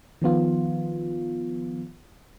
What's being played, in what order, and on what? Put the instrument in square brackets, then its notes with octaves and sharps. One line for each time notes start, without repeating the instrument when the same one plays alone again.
[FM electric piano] D#3 F3 B3 F4